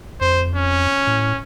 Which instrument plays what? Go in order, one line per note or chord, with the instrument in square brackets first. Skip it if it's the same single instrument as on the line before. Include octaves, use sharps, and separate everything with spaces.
[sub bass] F2 [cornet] C5
[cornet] C#4
[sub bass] A2